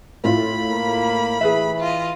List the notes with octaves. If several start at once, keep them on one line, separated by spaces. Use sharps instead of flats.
A2 E4 F4 B5
A#3
E3 G#4 B4 E5
F4 D#5